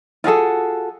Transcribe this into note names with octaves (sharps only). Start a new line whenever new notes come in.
F4 F#4 G#4 A4